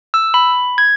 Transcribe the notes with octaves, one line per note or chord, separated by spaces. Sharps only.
E6
B5
G#6